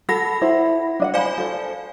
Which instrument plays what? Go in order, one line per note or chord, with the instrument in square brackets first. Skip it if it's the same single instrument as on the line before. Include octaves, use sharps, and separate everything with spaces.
[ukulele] A4 [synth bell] F#5 B5 A#6
[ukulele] E4 C5
D4 D#5 F#5
[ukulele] C5 B5 [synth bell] D5 F5 G#5
[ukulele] A4 C5